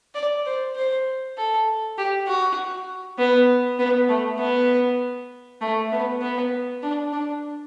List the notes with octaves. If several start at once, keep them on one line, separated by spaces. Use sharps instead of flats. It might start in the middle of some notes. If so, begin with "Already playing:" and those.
D5
C5
C5
A4
G4
F#4
B3
B3
A3
B3
A3
B3
B3
D4
D4